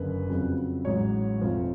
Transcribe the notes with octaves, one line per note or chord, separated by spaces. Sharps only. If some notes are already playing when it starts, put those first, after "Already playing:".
Already playing: F#1 F#2 D3 B4
F2 C#3 F#3
A1 G#2 F#3 C#5
F1 F2 F3